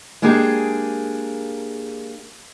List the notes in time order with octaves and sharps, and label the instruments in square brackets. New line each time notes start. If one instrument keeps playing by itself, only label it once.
[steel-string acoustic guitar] G#3 A#3 D4 G4 G#4